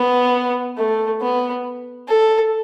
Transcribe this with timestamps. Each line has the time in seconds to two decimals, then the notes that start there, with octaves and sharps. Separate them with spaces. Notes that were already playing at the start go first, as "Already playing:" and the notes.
Already playing: B3
0.78 A3
1.21 B3
2.08 A4